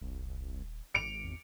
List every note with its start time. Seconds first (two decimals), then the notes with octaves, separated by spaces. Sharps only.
0.01 D#1 C2
0.94 G#1 C#7 D7 F7
1.24 E2